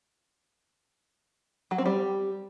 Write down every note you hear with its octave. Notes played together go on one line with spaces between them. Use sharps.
F#3
C4
G3